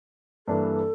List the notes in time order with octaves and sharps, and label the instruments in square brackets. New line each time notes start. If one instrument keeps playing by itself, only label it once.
[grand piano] G2 E3 G3 A#3 D4 [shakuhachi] A4